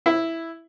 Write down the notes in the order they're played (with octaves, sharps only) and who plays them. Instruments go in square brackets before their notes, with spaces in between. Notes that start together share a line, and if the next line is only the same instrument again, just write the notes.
[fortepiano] E4